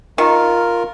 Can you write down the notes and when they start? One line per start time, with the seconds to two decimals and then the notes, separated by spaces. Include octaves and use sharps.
0.18 D#3 F4 A#4